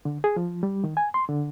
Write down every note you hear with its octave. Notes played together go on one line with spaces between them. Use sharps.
D3
G#4
F3
G3
D#3
G#5
C6
D3